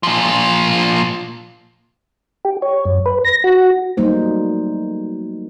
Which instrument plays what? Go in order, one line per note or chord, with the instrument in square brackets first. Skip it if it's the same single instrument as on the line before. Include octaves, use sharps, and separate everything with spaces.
[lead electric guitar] A#2 F3
[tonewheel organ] G4
C#5
F#2
B4
A#6
F#4
[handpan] F#3 G3 A3 A#3 D#4 C5